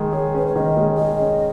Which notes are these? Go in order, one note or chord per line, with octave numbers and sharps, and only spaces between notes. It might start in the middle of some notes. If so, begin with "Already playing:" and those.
Already playing: D#3 G#3
G#4 C#5
C#4 B4
C#5
D#3 D#5
G#3
G#4 D#5
C#4